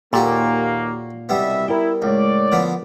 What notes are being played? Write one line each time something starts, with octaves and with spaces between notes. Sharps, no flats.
D#2 A#2 A#3 F#4 G4 A4
C2 B2 G3 B3 E5
E4 A#4 G5
C#2 A2 C#5 D5
D3 F3 B3